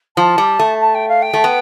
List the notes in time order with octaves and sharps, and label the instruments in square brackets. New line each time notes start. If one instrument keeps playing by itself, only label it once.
[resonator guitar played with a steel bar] F3 [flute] A5
[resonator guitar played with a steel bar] G3
A3
[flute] A5
G5
F5
G5
[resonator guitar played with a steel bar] A3
B3